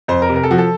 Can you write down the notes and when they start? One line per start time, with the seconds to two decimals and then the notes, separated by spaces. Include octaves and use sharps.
0.08 F2 C5
0.22 A#4
0.29 C3
0.36 A#4
0.43 A4
0.51 F3 F#4
0.58 A4